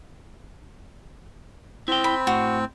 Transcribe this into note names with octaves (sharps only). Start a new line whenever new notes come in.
C4 E4 G5
B5
A2 F#4